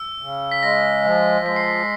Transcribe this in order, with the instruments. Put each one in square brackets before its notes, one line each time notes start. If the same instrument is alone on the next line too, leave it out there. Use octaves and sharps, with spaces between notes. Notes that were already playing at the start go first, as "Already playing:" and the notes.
Already playing: [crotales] E6
[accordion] C#3
[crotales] B6
[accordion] G#3 [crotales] A#6
[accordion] F3
[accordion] G#3 [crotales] B6
[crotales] C7
B6